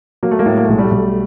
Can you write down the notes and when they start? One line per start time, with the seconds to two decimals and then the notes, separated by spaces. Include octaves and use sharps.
0.23 F#3 A#3
0.31 A3
0.39 G#3 A#3
0.46 A2
0.57 A#3
0.64 A3
0.68 B1 G#3
0.78 G3 A3
0.91 B1